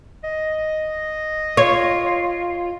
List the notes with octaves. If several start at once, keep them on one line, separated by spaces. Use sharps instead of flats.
D#5
F4 C#5